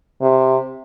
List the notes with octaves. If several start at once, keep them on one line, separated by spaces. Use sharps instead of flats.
C3